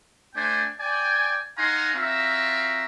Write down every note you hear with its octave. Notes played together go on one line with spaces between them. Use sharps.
A3 D4 C5 D5 G5 G#5
D5 G5 G#5
D#4 F5 F#5 G#5 A#5 C6
C4 F4 F#4 E5 F5 A#5